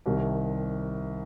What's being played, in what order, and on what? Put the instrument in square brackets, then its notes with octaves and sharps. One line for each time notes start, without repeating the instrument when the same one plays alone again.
[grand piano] C2 C3 D#3